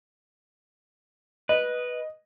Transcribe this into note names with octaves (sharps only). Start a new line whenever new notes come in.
B4 D#5